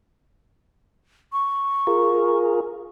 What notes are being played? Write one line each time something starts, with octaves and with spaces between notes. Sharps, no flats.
C#6
F4 G#4 A#4